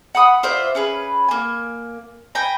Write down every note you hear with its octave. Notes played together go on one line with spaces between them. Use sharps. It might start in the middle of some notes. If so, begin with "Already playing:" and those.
F#5 B5 D#6
F4 C5 D5 E5
C#4 G#4 B4
A#3 G#5
G5 G#5 A#5 B5